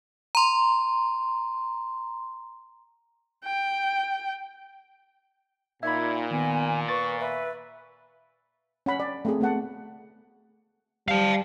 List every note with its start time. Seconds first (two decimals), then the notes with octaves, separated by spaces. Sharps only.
0.35 A#5 C6
3.44 G5
5.83 A#2 D#4 E5 B5 G#6
6.31 D#3 B3 G#5
6.89 B4 C#6 A6
7.20 B4 E5
8.86 C#4 F#5 B5
9.00 D5
9.25 A3 C4 G#4
9.41 A3 B3 F#5 A5
11.08 G3 F5 A5